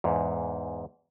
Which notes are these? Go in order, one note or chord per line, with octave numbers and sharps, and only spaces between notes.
E2 G#2